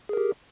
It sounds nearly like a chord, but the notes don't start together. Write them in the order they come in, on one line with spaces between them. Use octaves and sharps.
G#4 A#4 G4